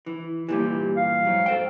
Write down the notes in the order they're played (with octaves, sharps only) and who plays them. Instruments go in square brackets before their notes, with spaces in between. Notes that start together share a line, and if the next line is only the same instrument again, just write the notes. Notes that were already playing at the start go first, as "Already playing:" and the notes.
[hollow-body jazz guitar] E3
[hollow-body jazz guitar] G2 A#2 E3 [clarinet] G4
[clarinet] F5
[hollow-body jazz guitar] G#2 F#3
A4 C5 G5